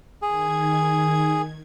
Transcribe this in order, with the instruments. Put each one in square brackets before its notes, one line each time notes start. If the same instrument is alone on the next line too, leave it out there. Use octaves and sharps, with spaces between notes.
[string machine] D#3 G#6 [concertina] G#4